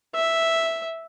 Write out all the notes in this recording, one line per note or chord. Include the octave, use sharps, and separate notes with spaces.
E5